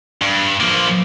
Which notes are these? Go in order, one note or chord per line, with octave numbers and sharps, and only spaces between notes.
G2
F3 A#3